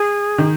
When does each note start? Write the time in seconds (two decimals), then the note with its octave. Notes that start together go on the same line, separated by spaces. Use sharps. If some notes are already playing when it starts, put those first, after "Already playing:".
Already playing: G#4
0.38 D#3